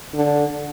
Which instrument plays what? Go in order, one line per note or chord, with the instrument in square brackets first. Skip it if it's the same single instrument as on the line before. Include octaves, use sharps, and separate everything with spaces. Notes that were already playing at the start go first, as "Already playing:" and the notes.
[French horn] D3